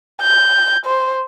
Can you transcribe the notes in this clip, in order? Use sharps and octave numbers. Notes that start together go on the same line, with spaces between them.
G6
C5